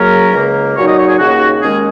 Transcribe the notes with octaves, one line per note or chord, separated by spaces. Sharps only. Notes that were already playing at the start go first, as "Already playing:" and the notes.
Already playing: F#2 C#3 F#3 A#3 C#4 A#4
C#2 C#3 A#3
A#2 F#3 D#4 C#5
D#5
C#5
G#4
D#2 C#3 A#3 D#4 F#4
D#2 D#3 G#3 C#4 G#4